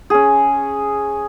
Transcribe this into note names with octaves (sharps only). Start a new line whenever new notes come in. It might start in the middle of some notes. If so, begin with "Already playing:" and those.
C#4 G#4